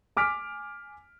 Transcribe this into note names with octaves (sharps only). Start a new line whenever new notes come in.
G#5 D6 F6 B6 D7